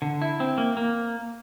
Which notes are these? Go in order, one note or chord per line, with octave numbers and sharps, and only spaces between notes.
D3
E4
C4
A#3
A#3